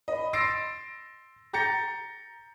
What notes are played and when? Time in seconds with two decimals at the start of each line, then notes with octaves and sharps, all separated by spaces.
0.08 D#5 B5
0.33 C6 E6 A6 A#6 C7 D7
1.53 A#5 G6 A6 A#6 C#7